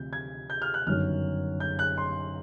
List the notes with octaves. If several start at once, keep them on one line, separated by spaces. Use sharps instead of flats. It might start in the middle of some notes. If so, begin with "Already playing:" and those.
Already playing: D2 C3 F3 G6
G#6
G6
F6
F#6
G1 F#2 D#3 F#3 F6
G6
F#6
C6